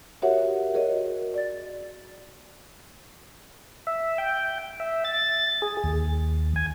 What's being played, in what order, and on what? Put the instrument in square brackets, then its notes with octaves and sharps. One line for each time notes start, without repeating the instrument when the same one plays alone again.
[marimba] F#4 G4 A#4 C#5 E5 F#5
F#4 G#4 A#4 C#5 D#5
D5 A6
[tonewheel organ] E5
G5
E5
A6
G#4
D#2
G#5